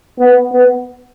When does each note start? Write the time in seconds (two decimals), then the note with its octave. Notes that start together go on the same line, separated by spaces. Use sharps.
0.19 B3
0.53 B3